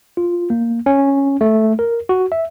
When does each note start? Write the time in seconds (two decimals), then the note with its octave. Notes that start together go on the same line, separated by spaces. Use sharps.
0.17 F4
0.50 A#3
0.86 C#4
1.41 A3
1.79 A#4
2.09 F#4
2.32 E5